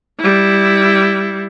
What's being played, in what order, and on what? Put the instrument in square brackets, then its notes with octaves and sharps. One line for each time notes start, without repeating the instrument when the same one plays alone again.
[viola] G3 E4